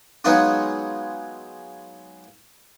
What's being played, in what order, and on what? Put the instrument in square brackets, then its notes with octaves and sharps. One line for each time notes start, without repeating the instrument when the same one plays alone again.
[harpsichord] F#3 G#3 B3 D#4 F4 F#4